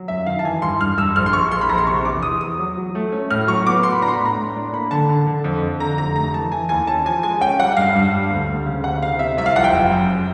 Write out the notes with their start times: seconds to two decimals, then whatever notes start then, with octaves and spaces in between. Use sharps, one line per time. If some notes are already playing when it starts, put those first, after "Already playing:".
Already playing: F#3
0.08 F#2 E5
0.26 D#3 F5
0.39 A5
0.44 E3 G#5
0.62 G2 C6
0.81 G2 F6
0.98 G2 E6
1.16 A#1 F6
1.26 C6
1.33 A#1 C#6
1.51 A#1 C6
1.61 B5
1.69 A#1 A#5
1.78 C6
1.87 C3 C#6
2.05 E2 D6
2.22 E3 D#6
2.41 E2 D#6
2.59 F#3
2.77 F#3
2.95 A3
3.12 C#4
3.30 A2 F6
3.48 F#3 C#6
3.66 B3 D6
3.83 B3 C6
3.92 B5
4.02 D4 A#5
4.08 C6
4.13 B5
4.20 A2
4.25 A#5
4.37 A2
4.56 D4
4.73 A#3 B5
4.91 D3 A5
5.09 D3
5.27 D3
5.44 F2
5.62 F2
5.80 D3 A#5
5.98 F1 A#5
6.16 A3 A#5
6.34 E3 A5
6.52 E3 G#5
6.69 D#2 G#5
6.87 C#4 A5
7.05 F3 G#5
7.23 G#3 G#5
7.41 C#4 G5
7.59 G3 F#5
7.77 G2 F5
7.95 G2
8.13 G3
8.30 D2
8.48 D2
8.66 C#3 F5
8.84 D2 F#5
9.02 C3 F5
9.19 C3 E5
9.37 C2 E5
9.46 F5
9.56 F3 F#5
9.64 G5
9.73 F#1
9.91 F#2